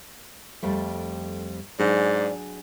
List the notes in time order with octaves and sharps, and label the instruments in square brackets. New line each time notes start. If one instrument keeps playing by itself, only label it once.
[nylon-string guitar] F2 G3 A3
[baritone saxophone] G#2 [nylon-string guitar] F#3 D4 G#4 [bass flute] D5